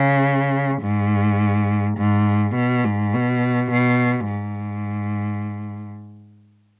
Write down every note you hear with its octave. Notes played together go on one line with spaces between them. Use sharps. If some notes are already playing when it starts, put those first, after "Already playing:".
Already playing: C#3
G#2
G#2
B2
G#2
B2
B2
G#2